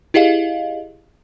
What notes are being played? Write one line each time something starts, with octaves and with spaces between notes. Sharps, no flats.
E4 G4 G#4 D#5 F5